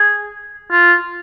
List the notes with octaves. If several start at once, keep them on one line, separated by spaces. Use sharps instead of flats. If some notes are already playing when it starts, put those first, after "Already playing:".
Already playing: G#4
F4